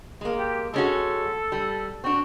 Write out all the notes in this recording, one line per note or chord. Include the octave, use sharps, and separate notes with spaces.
G#3 A#3
G4
G#3 C#4 F#4 A4
G3
C4 D4 F#4